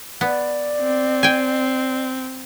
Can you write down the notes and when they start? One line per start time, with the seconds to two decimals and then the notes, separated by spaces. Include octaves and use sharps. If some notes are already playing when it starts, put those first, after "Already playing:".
0.21 B3 D5
0.81 C4
1.23 G5 G#5